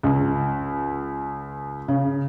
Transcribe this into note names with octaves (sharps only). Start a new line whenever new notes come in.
C#2
C#3